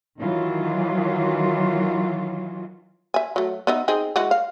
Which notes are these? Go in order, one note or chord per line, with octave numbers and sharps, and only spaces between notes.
D#3 E3 F#3 F4
E5 G#5
F#3 A3
B3 D#4 E5
C4 D#4 G#4
E3 G#3 F#4
F5